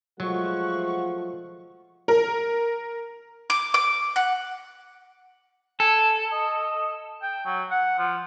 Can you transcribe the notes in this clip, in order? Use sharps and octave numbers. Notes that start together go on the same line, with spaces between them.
F3 F#3 G#3 A3 F#5 C#6
A#4
D6
D6
F#5
A4 G#5
D#5
G5
F#3
F#5
F3